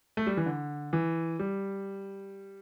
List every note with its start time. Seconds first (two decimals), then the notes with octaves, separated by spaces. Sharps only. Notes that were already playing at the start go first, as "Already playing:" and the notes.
0.17 A3
0.27 G3
0.37 E3
0.46 D3
0.93 E3
1.39 G3